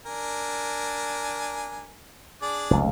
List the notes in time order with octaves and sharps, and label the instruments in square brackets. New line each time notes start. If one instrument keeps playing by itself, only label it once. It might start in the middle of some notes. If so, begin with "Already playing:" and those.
[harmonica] D4 A#4 G#5
D4 G#4 D5
[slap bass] F1 C#2